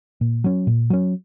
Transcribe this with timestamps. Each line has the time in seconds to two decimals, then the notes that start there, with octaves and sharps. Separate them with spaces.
0.21 A#2
0.44 F#3 C#4
0.67 A#2
0.90 F#3 C#4